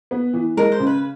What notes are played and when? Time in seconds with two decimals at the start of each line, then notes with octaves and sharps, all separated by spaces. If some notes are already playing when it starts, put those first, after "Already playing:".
0.11 B3
0.34 E3
0.57 G#3 A#4
0.72 C5
0.80 C#3
0.87 B4